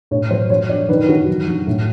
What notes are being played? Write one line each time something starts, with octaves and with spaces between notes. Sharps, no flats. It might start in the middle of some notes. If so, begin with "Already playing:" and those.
A2 C#5
F#3 C5
F#3 C#5
F#3 D5
D#3 B4
D#3 F#4
F#3
F#3
A2